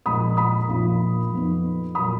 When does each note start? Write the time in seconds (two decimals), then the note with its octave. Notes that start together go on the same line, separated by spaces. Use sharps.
0.06 A#1 A#2 F3 G#3 B5 D#6
0.37 B5 D#6
0.69 A#1 A#2 F3 A#3
1.32 F2 F3 B3 D#4
1.95 A#2 F#3 B5 D#6